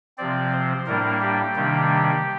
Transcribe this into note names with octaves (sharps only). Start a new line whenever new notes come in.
C3 F3 C4 D5
C5
A2 G3 A#3 D4 A#4
G4
C3 D#3 G3 A#3 D4